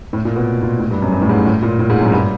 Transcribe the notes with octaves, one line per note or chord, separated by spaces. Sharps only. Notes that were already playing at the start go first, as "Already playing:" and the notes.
A2
A#2
B2
A#2
A2
G2
F#2
G2
A2
G#2
A2
A#2
A2
G#2
F#2
G#2
G2